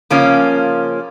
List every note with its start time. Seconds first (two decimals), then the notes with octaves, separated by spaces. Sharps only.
0.10 C#3 F3 A#3 C#4 F4